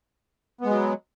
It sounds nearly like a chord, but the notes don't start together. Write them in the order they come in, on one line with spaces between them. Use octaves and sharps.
B3 G#3 F#3